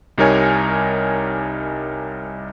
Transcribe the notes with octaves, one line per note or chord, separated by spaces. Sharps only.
C2 G3 D#4 A#4 C#5 G#5